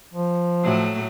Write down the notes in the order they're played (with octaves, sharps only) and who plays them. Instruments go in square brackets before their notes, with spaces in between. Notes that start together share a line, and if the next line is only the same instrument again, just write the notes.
[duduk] F3
[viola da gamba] A2 F#3 A3